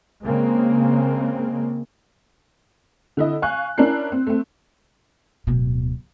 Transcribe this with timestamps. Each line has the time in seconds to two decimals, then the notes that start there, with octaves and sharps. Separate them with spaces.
0.24 C#3 G#3 A#3 C4
3.17 D3 E4 D#5
3.42 F5 G#5 C#6 F#6
3.78 C#4 D4 E4 A#4 F#6 C7
4.12 C4
4.27 A3 C4
5.47 D1 B2